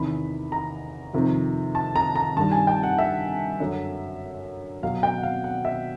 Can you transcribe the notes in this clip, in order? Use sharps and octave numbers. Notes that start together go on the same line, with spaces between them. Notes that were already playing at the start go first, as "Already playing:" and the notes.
Already playing: E2 C3 D#3 B5
A#5
F2 C3 D#3
A5
A#5
A#5
G2 D#3 G3 A5
G#5
G5
F#5
E5
F#2 D3 F#3
B2 F#3 F5
G5
F#5
F5
F#5
E5